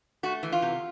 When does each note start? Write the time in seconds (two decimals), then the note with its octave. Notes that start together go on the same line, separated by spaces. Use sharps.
0.23 A3 F#4
0.43 E3
0.52 F4
0.62 C3